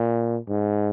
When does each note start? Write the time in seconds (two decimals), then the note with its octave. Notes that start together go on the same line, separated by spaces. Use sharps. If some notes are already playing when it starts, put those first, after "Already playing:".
Already playing: A#2
0.48 G#2